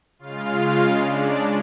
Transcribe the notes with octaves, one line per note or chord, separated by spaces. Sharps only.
C#3 G#3 F4 F5
D4 D5